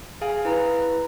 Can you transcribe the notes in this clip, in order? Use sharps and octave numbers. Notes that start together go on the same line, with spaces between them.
G#4 F5 G#5
E4 B4 A#5